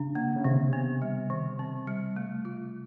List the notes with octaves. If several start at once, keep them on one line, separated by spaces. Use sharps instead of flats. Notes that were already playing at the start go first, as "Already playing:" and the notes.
Already playing: C#3 D4
A#3
C#3
C3 D#3
B3
G3
D#3
C4
G3
A3
F4